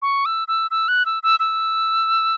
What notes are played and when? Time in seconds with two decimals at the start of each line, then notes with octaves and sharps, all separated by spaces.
0.02 C#6
0.26 E6
0.48 E6
0.71 E6
0.88 F#6
1.06 E6
1.23 E6
1.40 E6